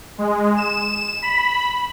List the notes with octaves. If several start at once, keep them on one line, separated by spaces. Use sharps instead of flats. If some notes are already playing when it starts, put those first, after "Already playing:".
G#3
E7
B5